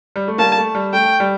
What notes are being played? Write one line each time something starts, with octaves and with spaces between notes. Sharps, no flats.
G3
A3
G3 A#3 A5
A3
G3
A3 G5
G3